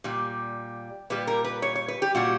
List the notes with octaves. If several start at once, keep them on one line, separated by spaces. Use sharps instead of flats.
A#2 G3
A#2 G3 B4
A#4
B4
C#5
C#5
B4
G4
A#2 G3 F#4